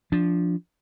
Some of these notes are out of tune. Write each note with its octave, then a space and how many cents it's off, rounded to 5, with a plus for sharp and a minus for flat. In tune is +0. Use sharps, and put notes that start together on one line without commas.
F3 +0 D4 -10